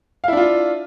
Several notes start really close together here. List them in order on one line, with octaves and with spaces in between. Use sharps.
F5 E4 D4 F4